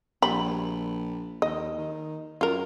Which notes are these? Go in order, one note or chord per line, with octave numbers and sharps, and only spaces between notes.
A#1 G3 B5
D#2 D#5
D#3
F#2 F4 A#4